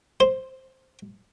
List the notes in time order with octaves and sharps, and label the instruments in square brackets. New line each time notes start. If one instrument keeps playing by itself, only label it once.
[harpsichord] C5